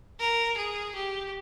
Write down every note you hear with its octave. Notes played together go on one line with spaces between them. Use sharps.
A#4
G#4
G4